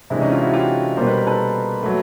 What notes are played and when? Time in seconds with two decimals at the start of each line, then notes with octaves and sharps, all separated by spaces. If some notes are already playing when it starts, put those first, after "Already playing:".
0.10 C3 E3 G#3 D4 E4
0.21 C#4 D#4
0.31 D#4 F4
0.42 E4 F#4
0.53 F4 G4
0.97 B2 G3 A#3 C5
1.07 B4
1.17 A#4
1.27 A4 B4
1.83 F#3 A3